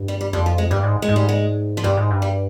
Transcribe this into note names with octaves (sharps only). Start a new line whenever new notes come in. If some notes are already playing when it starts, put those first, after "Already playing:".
Already playing: G2
G3
G3
F2 G3
F3
G#3
G2 G3
G#2
G#3
G#2
G3
G#3
F3
G2 G3
G#2
G2
G3